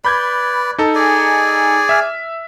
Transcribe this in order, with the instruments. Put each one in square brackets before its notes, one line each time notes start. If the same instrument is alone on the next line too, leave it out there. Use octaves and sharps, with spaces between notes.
[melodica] B4 D5 [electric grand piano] B5 G6 G#6
[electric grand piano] D#4 A4
[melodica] G#4 D5 G#5
[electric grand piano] E5 F6